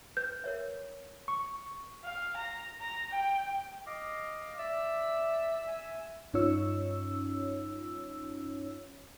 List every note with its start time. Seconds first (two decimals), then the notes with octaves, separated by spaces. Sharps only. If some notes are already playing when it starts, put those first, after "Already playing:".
0.17 B4 G6
0.44 A#4 C#5 E5
1.28 C#6
2.05 F5
2.36 A#5
2.81 A#5
3.11 G5
3.86 D#5 F5 D6
4.58 D5 E5
5.67 G#5
6.34 G2 C#4 D#4 F4 C#5 E6